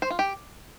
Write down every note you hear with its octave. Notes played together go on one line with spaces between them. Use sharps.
C5
F4
G4